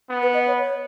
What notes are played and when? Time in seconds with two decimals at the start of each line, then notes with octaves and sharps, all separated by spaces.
0.10 B3
0.22 B4
0.34 D#5
0.47 C#5
0.60 C#5